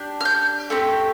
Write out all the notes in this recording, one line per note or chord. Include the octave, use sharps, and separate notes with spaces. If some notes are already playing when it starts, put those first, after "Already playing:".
Already playing: D4 G4
F6
G6
A3 C4 G4